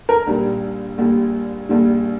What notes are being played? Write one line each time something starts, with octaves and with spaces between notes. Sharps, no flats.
A#4
A#1 A#2 G3
A#1 A#2 G3
A#1 A#2 G3